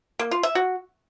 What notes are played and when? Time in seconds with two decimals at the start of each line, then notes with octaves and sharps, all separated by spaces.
0.19 A#3
0.31 F4
0.43 E5
0.55 F#4